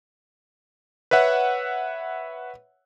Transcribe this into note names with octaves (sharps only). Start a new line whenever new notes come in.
B4 C#5 E5 F#5